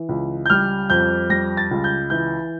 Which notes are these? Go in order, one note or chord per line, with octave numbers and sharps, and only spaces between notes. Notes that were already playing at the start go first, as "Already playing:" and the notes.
Already playing: E3
C#2
G6
G3 F6
F2 G6
G3 A#6
A6
C#2
G6
E3 G6